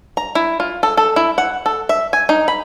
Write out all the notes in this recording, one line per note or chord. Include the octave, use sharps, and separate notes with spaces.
A#5
E4
F4
A4
A4
E4
F#5
A4
E5
G#5
D#4
B5